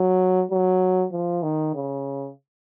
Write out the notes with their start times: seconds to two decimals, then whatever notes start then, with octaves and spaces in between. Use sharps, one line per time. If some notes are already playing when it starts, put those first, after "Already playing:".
Already playing: F#3
0.51 F#3
1.12 F3
1.43 D#3
1.75 C#3